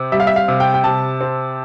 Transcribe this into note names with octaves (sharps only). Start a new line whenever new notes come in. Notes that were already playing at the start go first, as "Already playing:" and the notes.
Already playing: C3 C4
G3 E5
F5
E5
F5
C3
G5
G5
C3 A5
C4